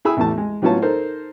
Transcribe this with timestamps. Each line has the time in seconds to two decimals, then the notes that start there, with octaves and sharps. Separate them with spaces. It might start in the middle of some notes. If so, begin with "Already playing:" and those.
0.05 E4 G#4 B5 E6
0.17 A1 E2 E3 A3 A5
0.38 G#3
0.62 A2 F#3 B3 C#4 F4 A5
0.82 D#4 A4 A#4 C5